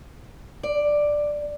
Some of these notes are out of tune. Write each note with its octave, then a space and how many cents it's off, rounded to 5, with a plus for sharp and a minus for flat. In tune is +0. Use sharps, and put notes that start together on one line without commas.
D5 +5